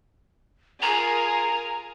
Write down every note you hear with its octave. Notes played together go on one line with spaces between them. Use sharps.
F4 G#4 A#4 A#5